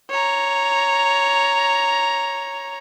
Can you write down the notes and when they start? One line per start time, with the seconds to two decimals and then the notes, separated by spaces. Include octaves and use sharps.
0.10 C#5 A#5